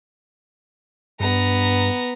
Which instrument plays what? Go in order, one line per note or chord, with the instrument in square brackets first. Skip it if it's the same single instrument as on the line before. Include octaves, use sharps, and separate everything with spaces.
[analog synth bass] G2 [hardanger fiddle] B3 A#5